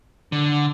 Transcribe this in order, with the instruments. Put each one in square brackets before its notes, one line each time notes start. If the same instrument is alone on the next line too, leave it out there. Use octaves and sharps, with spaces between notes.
[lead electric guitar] D3